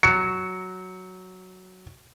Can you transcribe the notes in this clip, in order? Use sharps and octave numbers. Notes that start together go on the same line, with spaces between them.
F#3 C#7